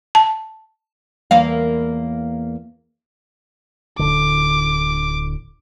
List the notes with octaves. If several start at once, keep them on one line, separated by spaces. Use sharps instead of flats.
A5
E2 A#3 F5
D1 A#1 D3 D6